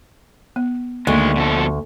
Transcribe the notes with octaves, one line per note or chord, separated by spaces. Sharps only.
B3
D2 D#3 G#3 A#3
B2 F3 A4